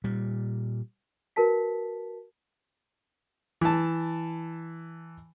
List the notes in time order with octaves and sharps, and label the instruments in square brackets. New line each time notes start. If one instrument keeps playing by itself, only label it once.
[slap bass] A#2 G3
[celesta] F#4 A#4 B4 A5 B6
[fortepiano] E3 A5